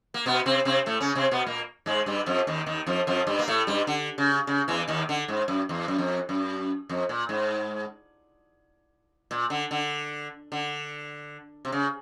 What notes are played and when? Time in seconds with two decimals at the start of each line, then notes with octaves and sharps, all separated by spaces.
0.14 A#3
0.26 B2 B3
0.46 C3 C4
0.65 C3 C4
0.86 A2 A3
1.01 C#3 C#4
1.15 C3 C4
1.31 B2 B3
1.47 A#2 A#3
1.86 G#2 G#3
2.06 G2 G3
2.26 F2 F3
2.47 D#2 D#3
2.66 D#2 D#3
2.87 F2 F3
3.07 F2 F3
3.27 G2 G3
3.39 A#3
3.48 A2 A3
3.67 G2 G3
3.87 D3
4.18 C#3
4.47 C#3
4.68 E2 E3
4.88 D#2 D#3
5.09 D3
5.28 G#2
5.48 F#2
5.69 E2
5.88 F#2
5.98 F2
6.29 F#2
6.89 F2
7.09 A#2
7.29 G#2
9.31 A#2
9.50 D3
9.71 D3
10.52 D3
11.65 C3
11.72 C#3